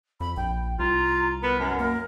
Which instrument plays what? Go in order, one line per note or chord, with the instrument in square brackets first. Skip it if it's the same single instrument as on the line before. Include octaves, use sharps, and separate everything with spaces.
[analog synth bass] F2 [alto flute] B5
[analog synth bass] A#1 [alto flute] G5
[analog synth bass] C2 [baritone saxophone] F4 [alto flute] A#5
[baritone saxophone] B3 [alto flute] A#4
[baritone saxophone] F#2
[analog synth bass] A#3 [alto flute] A#4